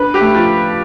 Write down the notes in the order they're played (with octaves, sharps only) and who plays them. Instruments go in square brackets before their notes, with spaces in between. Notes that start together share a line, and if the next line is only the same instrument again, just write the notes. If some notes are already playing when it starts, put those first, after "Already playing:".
Already playing: [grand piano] D4 [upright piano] B4
[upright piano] G4
[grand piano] A3
[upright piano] F3